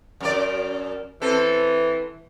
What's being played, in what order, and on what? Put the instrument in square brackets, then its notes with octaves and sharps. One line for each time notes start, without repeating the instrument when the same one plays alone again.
[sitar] F#2 A#4 D5
[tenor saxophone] E3 [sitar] C4 A4